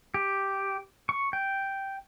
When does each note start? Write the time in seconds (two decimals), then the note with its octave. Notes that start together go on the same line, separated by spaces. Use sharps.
0.14 G4
1.09 C#6
1.33 G5